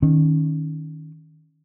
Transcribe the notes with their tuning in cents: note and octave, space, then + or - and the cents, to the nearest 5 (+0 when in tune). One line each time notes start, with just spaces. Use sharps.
D#3 +0 C#4 +0